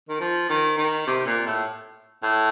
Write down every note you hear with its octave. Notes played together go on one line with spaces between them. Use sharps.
D#3
F3
D#3
D#3
C3
A#2
A2
A2